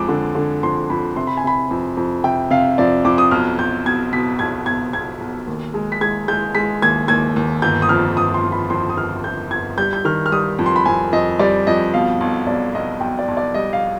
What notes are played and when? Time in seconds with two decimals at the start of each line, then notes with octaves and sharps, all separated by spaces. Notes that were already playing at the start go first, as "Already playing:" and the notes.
Already playing: F2 G#3 D6
0.08 D3
0.35 D3
0.63 F2 C6
0.90 F2 B5
1.16 C3 C6
1.27 B5
1.37 G#5
1.44 C3 B5
1.71 F2
1.97 F2
2.24 C3 G5
2.50 C3 F5
2.78 F2 D5
3.04 F2 D6
3.18 D#6
3.31 B1 F6
3.59 B1 G6
3.85 B2 G#6
4.13 B2 B6
4.39 B1 G#6
4.66 B1 G#6
4.93 B1 G#6
5.20 B1
5.47 D#2
5.74 G#3
5.92 B6
6.01 G#3 G#6
6.28 G#3 G6
6.55 G#3 B6
6.82 D#2 G#6
7.08 D#2 G#6
7.36 D#2
7.62 G1 G6
7.82 D#6
7.89 F2 F6
8.16 G1 D#6
8.34 C6
8.43 F2
8.52 B5
8.70 F2 C6
8.89 D#6
8.97 G1 F6
9.24 G1 G6
9.51 G1 G#6
9.78 G3 G6
9.93 G6
10.05 D#3 F6
10.26 F6
10.32 G3 D#6
10.58 F2
10.66 C6
10.76 B5
10.85 F2 G#5
11.13 F2 D#5
11.39 G3 D5
11.67 F2 D#5
11.93 B2 F5
12.20 B1
12.47 B1 D5
12.74 B1 D#5
13.01 B1 G5
13.19 D5
13.28 B1
13.37 D5
13.54 G3 D#5
13.73 F5